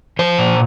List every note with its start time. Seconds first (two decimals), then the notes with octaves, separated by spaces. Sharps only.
0.19 F3 C5
0.38 A#2